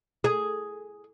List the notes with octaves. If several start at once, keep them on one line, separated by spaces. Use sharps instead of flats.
G#4